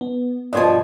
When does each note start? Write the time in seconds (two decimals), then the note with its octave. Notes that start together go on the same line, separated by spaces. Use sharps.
0.01 B3
0.53 G2 B2 F3 D#5 C6 G#6